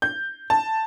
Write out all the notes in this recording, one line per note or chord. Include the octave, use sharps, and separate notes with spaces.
G6
A5